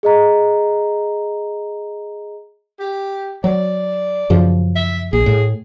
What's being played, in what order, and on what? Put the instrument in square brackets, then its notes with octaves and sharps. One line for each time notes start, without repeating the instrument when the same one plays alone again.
[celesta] G#4 D#5 A#5
[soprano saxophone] G4
[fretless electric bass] F#3 [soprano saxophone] D5
[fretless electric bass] F#2 C#3 F3
[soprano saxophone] E5
[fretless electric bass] A#1 [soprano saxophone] G#4
[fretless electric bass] A2